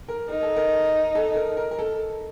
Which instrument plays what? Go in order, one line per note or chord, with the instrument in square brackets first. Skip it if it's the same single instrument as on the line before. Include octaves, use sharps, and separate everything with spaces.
[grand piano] A#4
[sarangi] D#4 [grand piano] A#4
[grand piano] A4
A#4
A4
A#4
A#4
A#4
A4